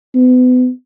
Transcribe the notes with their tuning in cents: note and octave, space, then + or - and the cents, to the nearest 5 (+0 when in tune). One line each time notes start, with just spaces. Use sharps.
B3 +35